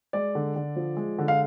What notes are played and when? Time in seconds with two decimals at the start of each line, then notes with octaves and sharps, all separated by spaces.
0.13 G#3 D5
0.35 D3
0.56 D3
0.76 F3
0.97 G#3
1.19 D3
1.28 F5